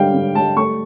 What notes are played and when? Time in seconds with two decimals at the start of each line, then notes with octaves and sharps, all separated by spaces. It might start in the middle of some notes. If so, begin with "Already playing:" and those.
Already playing: D3 G3 F5 G5
0.14 D3
0.35 G3 A5
0.56 A3 C#6